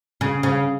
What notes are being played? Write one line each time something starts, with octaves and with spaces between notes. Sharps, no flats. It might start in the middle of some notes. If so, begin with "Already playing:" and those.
C#3
C#3